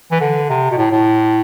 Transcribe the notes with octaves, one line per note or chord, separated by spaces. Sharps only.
E3
D3
C3
B2
A2
A2